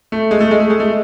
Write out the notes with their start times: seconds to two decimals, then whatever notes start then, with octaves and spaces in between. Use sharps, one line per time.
0.12 A3
0.31 G#3
0.40 A3
0.51 G#3
0.60 A3
0.70 G#3
0.80 A3